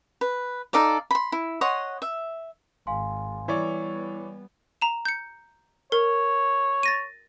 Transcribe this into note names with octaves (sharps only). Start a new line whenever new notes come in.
B4
D#4 A4 D5 F5
B5 C6
E4
C#5 D#5 F#5 C6
E5
G#1 F5 G#5 C6
E3 G3 B3 E4 C#5 D5
A#5 E7
G6 C#7
A#4 C#5
A6 A#6 D#7